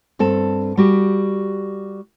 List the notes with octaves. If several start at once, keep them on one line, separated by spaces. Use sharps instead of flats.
G2 C4 A4 A5
G3 F#4 G4